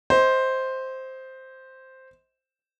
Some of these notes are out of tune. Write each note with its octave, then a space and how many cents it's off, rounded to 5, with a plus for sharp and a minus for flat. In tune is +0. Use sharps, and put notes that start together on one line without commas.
C5 +0 D#5 +30